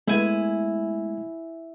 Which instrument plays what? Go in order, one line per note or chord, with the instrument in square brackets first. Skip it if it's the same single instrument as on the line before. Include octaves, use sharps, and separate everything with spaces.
[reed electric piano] G#3 A3 B3 [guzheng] E4 G#5